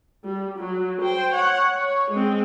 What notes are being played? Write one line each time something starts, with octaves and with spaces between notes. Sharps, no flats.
G3
F#3
C5 G5
C#5 F#5
C#5
G#3 C4